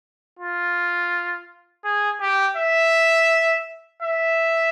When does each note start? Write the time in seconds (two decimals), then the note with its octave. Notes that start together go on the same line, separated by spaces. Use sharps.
0.39 F4
1.84 G#4
2.21 G4
2.57 E5
4.02 E5